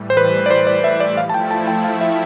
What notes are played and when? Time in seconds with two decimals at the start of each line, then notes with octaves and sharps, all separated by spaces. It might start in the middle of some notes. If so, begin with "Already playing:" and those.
Already playing: A2 E3 G3
0.10 C5
0.17 B4
0.46 D5
0.51 C5
0.67 D5
0.84 E5
1.00 D5
1.17 F3 A3 E4 F5
1.29 A5
1.34 G5
1.51 A5
1.67 G5
1.84 F5
2.01 E5